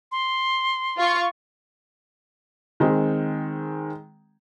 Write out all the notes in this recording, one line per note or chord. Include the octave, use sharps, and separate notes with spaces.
C6
F4 C#6
D#3 G#3 C4